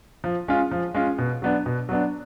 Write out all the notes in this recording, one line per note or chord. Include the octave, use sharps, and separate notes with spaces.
F3
G#3 C#4 F4
F3
G#3 C#4 F4
B2
F#3 B3 D4
B2
F#3 B3 D4